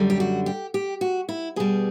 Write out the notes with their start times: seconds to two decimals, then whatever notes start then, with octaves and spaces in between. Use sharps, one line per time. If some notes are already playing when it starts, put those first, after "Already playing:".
Already playing: F#2 D3 G3
0.10 G4
0.20 F#4
0.46 G4
0.74 G4
1.01 F#4
1.29 E4
1.56 B2 G3 G#4